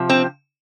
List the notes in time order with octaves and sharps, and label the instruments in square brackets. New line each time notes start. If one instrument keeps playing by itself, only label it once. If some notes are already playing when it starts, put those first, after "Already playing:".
Already playing: [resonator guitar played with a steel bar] C3 F3
C4